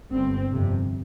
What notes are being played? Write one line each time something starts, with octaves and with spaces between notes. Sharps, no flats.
G1 G2 C4
G1 F2 C3